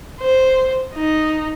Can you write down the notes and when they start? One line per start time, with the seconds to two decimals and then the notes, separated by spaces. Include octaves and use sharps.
0.20 C5
0.94 D#4